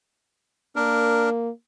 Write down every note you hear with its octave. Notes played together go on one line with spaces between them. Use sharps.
A#3 D4 A#4